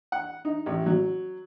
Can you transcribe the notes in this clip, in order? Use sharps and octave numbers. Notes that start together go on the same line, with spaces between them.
F#5
D#4
A1
F#3